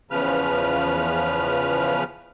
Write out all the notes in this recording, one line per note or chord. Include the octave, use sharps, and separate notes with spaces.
E2 C#3 F3 B4 F6